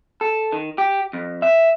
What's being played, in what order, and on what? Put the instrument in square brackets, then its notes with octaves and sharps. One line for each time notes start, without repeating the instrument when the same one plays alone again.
[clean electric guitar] A4
D#3
G4
F2
E5